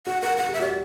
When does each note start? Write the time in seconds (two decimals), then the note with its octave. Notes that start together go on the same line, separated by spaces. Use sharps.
0.06 F#4 F#5
0.22 A#4 F#5
0.37 A#4 F#5
0.49 G4 E5
0.60 F#4 D5